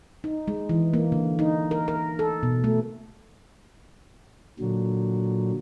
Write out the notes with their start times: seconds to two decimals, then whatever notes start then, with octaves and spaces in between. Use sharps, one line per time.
0.24 D#4
0.48 G#3
0.69 E3
0.94 A#3
1.12 D3
1.39 D#4
1.71 A#4
1.88 A#4
2.19 A4
2.43 B2
2.64 A3
4.60 A#2 D3 F#3